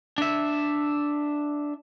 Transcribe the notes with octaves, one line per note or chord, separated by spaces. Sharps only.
D4 E5